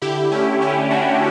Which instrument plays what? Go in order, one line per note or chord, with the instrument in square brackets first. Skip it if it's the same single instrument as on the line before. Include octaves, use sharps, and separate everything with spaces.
[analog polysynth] D3 E4 G4
A3 C#4 E4
D3 C#4 E4
A3 D4 F#4